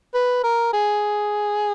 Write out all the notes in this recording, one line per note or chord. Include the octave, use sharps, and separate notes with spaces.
B4
A#4
G#4